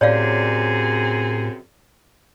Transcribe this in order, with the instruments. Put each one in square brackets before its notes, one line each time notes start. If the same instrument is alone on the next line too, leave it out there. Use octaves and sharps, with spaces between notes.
[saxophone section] F#2 C3 G#4 [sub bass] A2 [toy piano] C#5 D5 F5